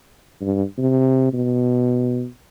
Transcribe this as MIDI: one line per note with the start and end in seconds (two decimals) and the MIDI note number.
0.41 0.64 43
0.78 1.30 48
1.33 2.26 47